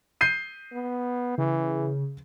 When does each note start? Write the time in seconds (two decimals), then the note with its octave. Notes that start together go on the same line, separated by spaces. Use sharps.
0.21 G6 C7 D#7
0.72 B3
1.38 C#3 E3